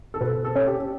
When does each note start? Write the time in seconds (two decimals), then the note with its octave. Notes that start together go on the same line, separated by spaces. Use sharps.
0.14 A4
0.21 B2 B4
0.45 A4
0.56 C#4
0.67 G4